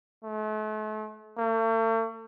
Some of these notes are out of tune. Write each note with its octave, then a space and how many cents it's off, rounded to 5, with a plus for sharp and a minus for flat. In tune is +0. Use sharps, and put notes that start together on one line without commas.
A3 -40
A3 +45